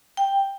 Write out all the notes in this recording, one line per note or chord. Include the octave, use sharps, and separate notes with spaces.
G5